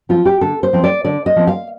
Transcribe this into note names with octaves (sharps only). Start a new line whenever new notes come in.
F3 C4 F4
G4
D3 A4
C5
F3 C4
D5
D3 D5
D#5
F3 C4
F5